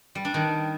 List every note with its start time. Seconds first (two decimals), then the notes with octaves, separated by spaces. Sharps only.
0.15 G3
0.25 D4
0.34 D#3